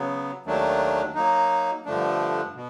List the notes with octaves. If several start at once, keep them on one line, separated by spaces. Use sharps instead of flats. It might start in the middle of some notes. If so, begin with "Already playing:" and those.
Already playing: C#3 F#3 B3
D#2 D#3 F#3 A3 D4
F#3 A#3 D#4
G2 D3 F3 A3 D4
B2